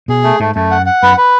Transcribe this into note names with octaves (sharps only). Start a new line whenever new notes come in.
B2 G#4
A3
G#2 A3
F#2 A3
F#5
F#5
F#2 B4
B4